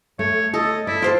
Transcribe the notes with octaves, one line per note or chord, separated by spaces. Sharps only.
A3 C#5
A4 D#5
E4 D5
F4 A4 C5 G5